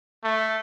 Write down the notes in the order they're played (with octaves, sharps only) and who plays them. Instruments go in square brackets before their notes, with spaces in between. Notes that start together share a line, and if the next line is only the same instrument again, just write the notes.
[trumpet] A3